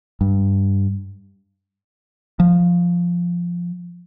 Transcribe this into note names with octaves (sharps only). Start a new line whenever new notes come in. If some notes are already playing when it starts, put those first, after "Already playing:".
G2
F3